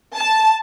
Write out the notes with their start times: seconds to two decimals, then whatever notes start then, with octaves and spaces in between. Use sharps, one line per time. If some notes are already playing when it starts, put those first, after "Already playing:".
0.16 A5